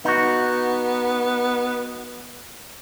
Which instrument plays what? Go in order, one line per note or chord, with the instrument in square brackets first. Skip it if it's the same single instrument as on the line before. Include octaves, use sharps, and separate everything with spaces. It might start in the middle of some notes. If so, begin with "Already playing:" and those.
[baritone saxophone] B3 [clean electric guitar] D#4 F#4